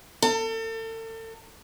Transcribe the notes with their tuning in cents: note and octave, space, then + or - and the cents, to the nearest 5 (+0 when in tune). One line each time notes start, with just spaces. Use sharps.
A4 +35